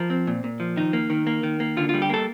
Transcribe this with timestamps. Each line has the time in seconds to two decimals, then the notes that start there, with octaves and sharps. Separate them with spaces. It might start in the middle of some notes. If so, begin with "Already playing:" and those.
Already playing: F3 A#4
0.10 C4
0.27 A#2
0.44 A#2
0.60 F3
0.76 D#3 D#4
0.93 A#3
1.10 D#3
1.27 A#3
1.43 D#3
1.60 A#3
1.77 D3 F4
1.89 G3 F4
2.02 G4
2.10 A#3 A4